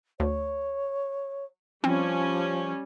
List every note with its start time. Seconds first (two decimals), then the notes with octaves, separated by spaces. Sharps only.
0.20 D2 C#5
1.84 F3 G3 C4 C#4